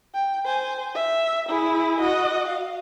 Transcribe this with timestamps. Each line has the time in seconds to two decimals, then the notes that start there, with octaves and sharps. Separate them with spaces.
0.14 G5
0.46 C5 G#5
0.95 E5
1.49 E4 G#4
2.00 F#4 D#5
2.49 F5